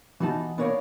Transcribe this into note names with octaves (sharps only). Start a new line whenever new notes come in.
E3 B3 D#4 F#4 A5
B3 D4 A#4 C#5 F5